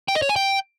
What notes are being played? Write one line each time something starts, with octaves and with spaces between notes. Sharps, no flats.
G5
D#5
C#5
G#5
G5